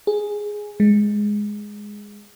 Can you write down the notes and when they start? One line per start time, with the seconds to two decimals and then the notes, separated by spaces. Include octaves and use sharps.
0.07 G#4
0.80 G#3